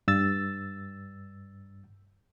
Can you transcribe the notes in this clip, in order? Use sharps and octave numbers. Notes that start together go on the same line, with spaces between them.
G2 E6 A6